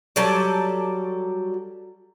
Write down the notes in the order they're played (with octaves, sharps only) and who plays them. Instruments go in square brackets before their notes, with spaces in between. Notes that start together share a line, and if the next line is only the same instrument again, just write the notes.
[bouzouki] F#3 G3 A4 D5